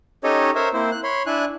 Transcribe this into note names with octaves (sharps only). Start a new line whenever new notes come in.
C#4 D#4 G4 A4 C#5 D#5
A#4 C5 C#5 E5
A#3 C4 E4 C5
F#6
C#5 B5 C6
D4 E4 G#5 F#6